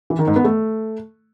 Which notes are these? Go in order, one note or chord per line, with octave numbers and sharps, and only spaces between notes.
E3
D#3
G#2
B3
A3